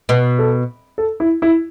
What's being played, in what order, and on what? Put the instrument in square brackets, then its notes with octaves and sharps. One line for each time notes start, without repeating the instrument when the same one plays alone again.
[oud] B2 [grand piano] B4
[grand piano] A4
A4
E4
E4